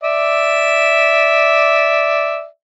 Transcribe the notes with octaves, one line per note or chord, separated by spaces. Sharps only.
D5 E5